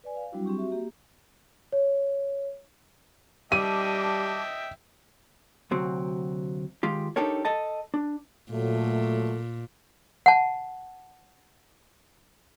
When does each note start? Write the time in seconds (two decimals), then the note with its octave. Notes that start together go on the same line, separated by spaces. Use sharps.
0.04 B4 D5 G#5
0.16 F5
0.32 F#3 G3 C4 D4 E4 F#4
0.45 C4 G4 C#6
0.58 F#4 E5
0.72 A#3 G4
1.72 C#5
3.52 G3 D#5 E5 G5 A5 D6 D#7
5.71 D2 C3 F#3 C4
6.83 D#3 G#3 F4 G4
7.16 D4 D#4 G4 A4 A#4 C#5
7.45 A4 D#5 A5
7.94 D4
8.52 A#2 F#3 A3
10.26 F#5 A5